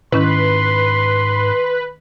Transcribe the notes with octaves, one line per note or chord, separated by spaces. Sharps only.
G#2 D#3 C#4 E4 B4 C6